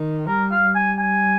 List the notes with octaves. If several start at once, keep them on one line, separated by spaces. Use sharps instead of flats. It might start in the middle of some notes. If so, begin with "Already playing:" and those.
Already playing: D#3
G3 A#4
F5
G3
G#5
G#5